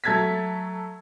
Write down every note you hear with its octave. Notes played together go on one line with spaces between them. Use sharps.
F#3 A3 A4 G#6 A6 B6